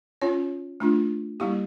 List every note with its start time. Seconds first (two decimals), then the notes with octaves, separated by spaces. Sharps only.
0.21 C#4 F4 C#5
0.80 A3 D4 F4
1.40 G3 A#3 E4 G4